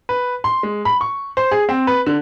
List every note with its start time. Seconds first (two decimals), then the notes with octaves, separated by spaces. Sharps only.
0.09 B4
0.44 C6
0.63 G#3
0.85 B5
1.01 C#6
1.37 C5
1.51 G#4
1.69 C4
1.87 B4
2.06 D3